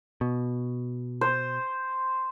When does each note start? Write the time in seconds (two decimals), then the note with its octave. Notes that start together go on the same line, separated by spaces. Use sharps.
0.21 B2
1.21 C5